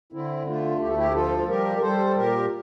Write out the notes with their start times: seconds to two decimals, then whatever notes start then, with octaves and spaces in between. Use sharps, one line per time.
0.13 D3 C4 E4
0.47 A3 D4 F4
0.80 D2 G4
0.88 A4
0.96 E4 G4
1.14 F3 F4 A4
1.48 G3 G4 A#4
1.76 A#4
1.82 G3 A4 C5
2.07 A4
2.16 A#2 G4 A#4